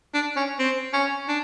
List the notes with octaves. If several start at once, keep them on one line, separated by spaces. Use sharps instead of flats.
D4
C#4
C4
C#4
D4